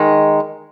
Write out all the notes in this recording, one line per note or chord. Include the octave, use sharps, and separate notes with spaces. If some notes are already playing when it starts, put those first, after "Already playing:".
Already playing: D#3 G#3